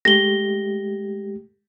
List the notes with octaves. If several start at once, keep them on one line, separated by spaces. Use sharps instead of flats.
G#3 A3 G4 A#6 G7